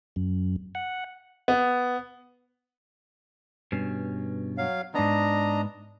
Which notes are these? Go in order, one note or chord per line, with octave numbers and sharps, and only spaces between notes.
F#2
F#5
B3
G2 B2 C#4
F#3 F5
G#2 B3 D4 D#5 A#5